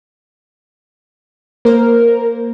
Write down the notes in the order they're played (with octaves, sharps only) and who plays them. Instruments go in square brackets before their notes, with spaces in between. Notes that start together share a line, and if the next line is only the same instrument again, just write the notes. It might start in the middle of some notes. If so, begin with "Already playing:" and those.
[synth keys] A#3 C5 [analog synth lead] A#4